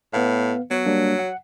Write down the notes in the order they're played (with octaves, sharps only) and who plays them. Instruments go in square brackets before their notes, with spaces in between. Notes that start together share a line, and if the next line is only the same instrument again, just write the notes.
[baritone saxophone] A2 [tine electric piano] B3 B4 F5
[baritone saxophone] F#3 [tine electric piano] B3 C#5
[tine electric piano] G3 A#3 D4
F#5